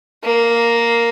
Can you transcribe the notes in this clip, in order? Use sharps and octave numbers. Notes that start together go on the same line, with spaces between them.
A#3